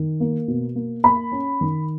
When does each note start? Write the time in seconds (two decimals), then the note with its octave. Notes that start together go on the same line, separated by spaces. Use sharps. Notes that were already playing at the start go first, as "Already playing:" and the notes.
Already playing: D#3
0.20 A#3
0.48 B2
0.75 A#3
1.04 A#3 B5
1.32 C#4
1.61 D#3